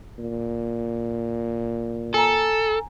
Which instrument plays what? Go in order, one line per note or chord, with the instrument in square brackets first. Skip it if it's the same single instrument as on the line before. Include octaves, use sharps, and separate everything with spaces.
[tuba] A#2
[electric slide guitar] A4 [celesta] G#5 A#5